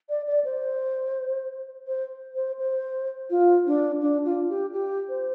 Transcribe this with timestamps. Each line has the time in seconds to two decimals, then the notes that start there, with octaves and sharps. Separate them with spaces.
0.09 D5
0.27 D5
0.45 C5
1.87 C5
2.35 C5
2.59 C5
3.30 F4
3.67 D4
4.01 D4
4.25 F4
4.50 G4
4.73 G4
5.09 C5